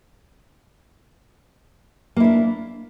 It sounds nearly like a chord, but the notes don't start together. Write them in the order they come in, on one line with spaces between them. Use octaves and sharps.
A#3 E4 D4